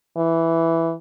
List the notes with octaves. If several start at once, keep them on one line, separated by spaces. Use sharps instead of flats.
E3